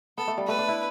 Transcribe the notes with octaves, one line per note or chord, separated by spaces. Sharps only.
B3 A4
A3
G3
A3 B4
D4
E4